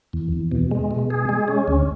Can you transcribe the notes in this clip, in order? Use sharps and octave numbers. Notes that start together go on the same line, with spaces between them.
E2
E2
B2
G#3
B2
G#4
G#3
C#4
D2